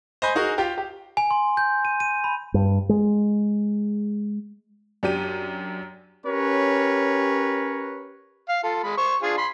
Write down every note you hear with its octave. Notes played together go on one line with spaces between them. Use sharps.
C5 D#5 G#5 B5 G6
D#4 F#4 G#4 A#4
F4 G4 G5
G4
G#5
C6
G6
D#7
D#7
B5
G2
G#3
F#2 D4 G4 D#7
C#4 G4 A#4 B4 C#5
F5
F4 A4
G#3 B5
C5 C#6
D4 F4 G#4
B5 C6